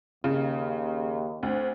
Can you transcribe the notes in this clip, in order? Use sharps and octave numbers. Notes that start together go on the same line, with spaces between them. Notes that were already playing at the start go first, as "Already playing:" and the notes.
D#2 C#3
D2 C4